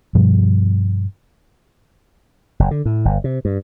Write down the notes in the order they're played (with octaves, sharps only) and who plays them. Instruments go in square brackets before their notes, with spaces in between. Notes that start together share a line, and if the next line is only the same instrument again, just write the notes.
[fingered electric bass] G2 B2 F3 G3
[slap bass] F#1
D3
A2
G1
C3
G2